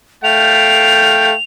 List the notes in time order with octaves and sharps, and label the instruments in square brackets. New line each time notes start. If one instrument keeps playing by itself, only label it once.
[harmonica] A3 F5 G5 [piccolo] F7